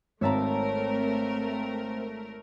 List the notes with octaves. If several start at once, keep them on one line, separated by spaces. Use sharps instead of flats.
G#1 A3 C4 A#4 C#5 E5 A5 A#5